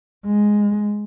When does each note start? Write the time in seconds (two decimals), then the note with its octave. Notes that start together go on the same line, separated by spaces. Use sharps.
0.25 G#3